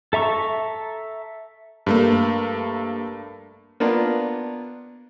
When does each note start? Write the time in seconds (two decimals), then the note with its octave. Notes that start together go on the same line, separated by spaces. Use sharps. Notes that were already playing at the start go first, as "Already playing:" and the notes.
0.13 A4 E5 A#5 C#6
1.87 G2 A3 A#3
3.80 A#3 B3 D4 F4